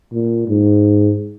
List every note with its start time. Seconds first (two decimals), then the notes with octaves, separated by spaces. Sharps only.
0.12 A#2
0.48 G#2